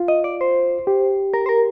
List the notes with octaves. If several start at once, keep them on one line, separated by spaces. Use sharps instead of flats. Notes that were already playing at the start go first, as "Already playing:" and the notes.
Already playing: F4
D#5
D5
C5
G4
A#4
C5
A#4